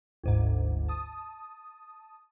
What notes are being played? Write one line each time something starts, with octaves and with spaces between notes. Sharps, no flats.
G1 D2 G#2
A5 D#6